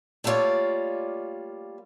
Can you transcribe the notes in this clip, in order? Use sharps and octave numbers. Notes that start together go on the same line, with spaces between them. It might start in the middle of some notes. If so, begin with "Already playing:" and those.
G3 A3 A#3 F4 C#5 D5